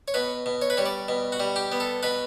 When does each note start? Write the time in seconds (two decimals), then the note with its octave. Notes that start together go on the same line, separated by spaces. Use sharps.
0.08 C#5
0.14 B2 B4
0.46 B2
0.62 C#5
0.70 B4
0.77 G3 C#5
0.86 D5
1.08 B2
1.32 F#4
1.40 G3
1.56 G4
1.72 B3
1.80 A4
2.03 B2 B4